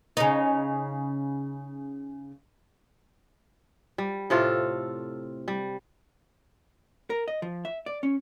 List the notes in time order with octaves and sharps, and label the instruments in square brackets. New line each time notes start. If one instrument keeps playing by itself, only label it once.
[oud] C#3 D#4
[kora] G3
A2 C3 F4 A4
G3
[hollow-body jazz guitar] A#4
D#5
F3
E5
D5
C#4